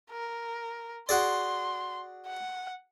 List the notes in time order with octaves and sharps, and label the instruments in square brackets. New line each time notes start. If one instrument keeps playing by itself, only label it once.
[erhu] A#4
[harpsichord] F#4 G#4 D5 [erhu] C6
[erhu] F#5